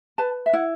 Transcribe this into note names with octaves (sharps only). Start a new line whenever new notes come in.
B4 A5
E5
E4 F#5